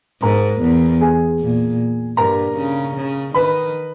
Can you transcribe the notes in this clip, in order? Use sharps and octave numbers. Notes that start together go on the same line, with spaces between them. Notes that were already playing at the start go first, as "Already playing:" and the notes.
G#2 A#4 A#5
E2
G#4 G#5
A#2
G2 A#4 A#5
C#3
C#3
D#3 B4 B5